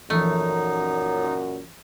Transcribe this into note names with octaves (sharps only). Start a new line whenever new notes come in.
F#2 A#2 E3 F3 A3 D#4